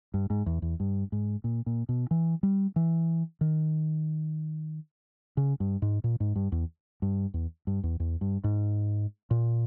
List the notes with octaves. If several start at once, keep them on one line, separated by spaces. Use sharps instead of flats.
G2
G#2
E2
E2
G2
G#2
A#2
A#2
B2
E3
G3
E3
D#3
C#3
G2
G#2
A#2
G#2
G2
E2
G2
E2
G2
E2
E2
G2
G#2
A#2